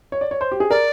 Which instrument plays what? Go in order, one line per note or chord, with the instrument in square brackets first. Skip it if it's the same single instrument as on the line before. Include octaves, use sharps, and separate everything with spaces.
[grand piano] C#5
D5
C#5
C5
G4
G#4
[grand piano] A#4 [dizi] D5